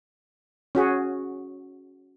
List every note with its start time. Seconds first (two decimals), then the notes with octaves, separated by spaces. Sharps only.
0.75 C#4 F#4 G#4